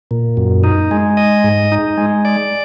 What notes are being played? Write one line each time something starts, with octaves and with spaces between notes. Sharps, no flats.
A#2
F#2
D#4
G#3
D#5
G#2
D#4
G#3
D5